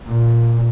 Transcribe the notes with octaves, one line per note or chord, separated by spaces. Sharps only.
A#2